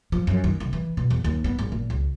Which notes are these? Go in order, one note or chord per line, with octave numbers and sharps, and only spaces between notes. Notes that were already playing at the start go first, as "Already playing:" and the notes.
F3
F#2
D#3
C2
E3
B2
E2
D#2
B3
G#1
A#2
C#2